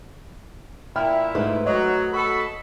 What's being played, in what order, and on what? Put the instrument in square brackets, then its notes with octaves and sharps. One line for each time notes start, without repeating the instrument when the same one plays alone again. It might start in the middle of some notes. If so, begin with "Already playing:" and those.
[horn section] A#2 E4 [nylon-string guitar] E5 [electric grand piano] G5 B5 F6
[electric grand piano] G#2 [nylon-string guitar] A3 B4 C5
[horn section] F#3 [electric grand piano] C#5 D#5
[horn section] F#4 A4 B5